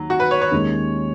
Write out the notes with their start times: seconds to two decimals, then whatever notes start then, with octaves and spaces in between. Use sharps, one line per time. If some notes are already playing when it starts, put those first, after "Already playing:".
Already playing: D#2 D#3 F#3 D#4
0.10 F#4
0.20 B4
0.31 C#5
0.42 C#5
0.51 D#2 D#3 G#3 C#4